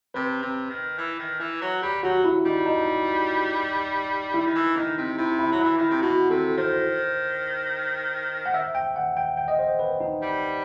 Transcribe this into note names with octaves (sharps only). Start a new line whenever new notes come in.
C3 B4
C3
D#3
E3
D#3
E3
F#3
G3 G4
F#3 F#4
E4
G3 D#4
D#4
E4
D#3
E3
D#3 D#4
C3
C3 E4
E4
F#3
E3 E4
D#3 E4
C3
B2 F#4
C3 A4
D#3 C5
F#5
E5
G5
F#5
G5
G5
D#5
C5
B4
D#4
G3